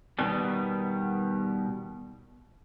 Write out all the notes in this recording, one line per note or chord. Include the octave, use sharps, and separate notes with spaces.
B2 D#3 G3 B3